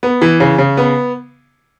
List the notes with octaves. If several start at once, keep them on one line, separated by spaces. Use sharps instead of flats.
B3
E3
C#3
C#3
B3